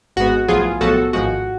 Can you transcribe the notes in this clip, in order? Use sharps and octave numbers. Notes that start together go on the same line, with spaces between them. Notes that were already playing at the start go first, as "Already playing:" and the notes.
G#1 G#2 G#3 B3 F#4
B1 A2 F3 B3 F4 G#4
B1 A2 F3 B3 F#4 A4
G#1 G#2 F3 G#3 F#4